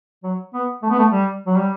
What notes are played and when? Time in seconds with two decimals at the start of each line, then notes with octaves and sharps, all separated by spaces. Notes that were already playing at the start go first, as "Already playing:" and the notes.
0.23 F#3
0.54 B3
0.83 A3
0.90 B3
0.98 A3
1.12 G3
1.47 F#3
1.56 G3